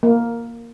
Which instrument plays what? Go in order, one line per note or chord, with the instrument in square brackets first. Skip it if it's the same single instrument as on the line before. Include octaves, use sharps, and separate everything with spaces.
[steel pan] A#3